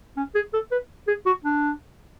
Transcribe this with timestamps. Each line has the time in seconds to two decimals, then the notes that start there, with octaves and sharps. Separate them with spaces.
0.17 C#4
0.35 G#4
0.53 A4
0.72 B4
1.08 G#4
1.26 F#4
1.44 D4